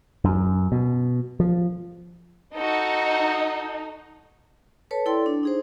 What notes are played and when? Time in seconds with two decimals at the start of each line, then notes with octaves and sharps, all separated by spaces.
0.24 F#2
0.72 B2
1.40 F3
2.56 D#4 F#4 A4
4.91 A4 B4 C#5 A5
5.06 E4 A4 D5 G5 C6
5.26 D4
5.43 D#4 G#4 C5